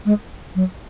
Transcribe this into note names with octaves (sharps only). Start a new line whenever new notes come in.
G#3
F#3